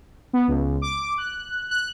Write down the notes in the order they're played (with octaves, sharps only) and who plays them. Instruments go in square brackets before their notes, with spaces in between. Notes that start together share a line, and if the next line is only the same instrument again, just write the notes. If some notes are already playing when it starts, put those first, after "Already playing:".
[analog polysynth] B3
C#2
D6
F#6
F#6